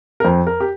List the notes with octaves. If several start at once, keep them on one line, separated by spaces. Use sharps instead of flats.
A#4
F2 C5
A#4
G4